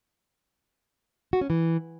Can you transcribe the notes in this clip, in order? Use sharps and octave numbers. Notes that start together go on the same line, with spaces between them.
F#4
C#4
E3